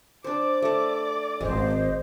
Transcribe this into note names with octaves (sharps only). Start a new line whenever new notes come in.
D4 C5 D5 D6
A3 A4
D#1 G#1 G#3 C5 D#5